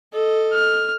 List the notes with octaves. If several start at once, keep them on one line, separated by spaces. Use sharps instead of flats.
A4 D#5
F6